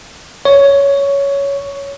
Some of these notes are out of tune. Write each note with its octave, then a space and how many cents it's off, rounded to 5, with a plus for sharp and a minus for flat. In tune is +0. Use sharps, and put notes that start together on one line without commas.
C#5 +10